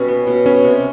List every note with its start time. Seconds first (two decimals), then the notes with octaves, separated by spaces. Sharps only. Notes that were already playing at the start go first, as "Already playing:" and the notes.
Already playing: B2 G3 C#4
0.08 B3
0.27 B2
0.46 B3 C#4
0.64 C3